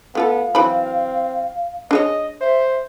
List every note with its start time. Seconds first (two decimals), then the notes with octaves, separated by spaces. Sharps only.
0.15 A3 B3 F4 A4 F5
0.55 E3 F#3 C4 B5
1.91 D4 G#4 C#5 D#5
2.41 C5 E5